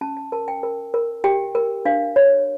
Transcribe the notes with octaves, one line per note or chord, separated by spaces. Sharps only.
C#4 A5
A5
A#4 A5
G5
A#4
A#4
G4 G5
A#4
D4 F5
C#5